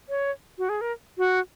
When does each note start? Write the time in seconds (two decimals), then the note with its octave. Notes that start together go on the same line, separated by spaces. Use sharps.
0.09 C#5
0.58 F#4
0.69 G#4
0.81 A#4
1.18 F#4